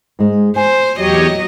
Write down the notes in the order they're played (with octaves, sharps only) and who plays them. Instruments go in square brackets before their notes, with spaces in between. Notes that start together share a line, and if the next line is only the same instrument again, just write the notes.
[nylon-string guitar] G#2 G#3
[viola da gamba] C5 [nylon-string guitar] G#5
[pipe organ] E2 G4 C#5 [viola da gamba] F#3 D#5